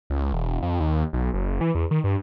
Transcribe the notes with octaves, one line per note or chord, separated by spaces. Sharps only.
C#2
E1
F2
D#2
B1
F#1
E3
E2
D#3
G2